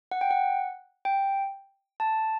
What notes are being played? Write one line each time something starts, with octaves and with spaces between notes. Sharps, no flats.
F#5
G5
F#5
G5
A5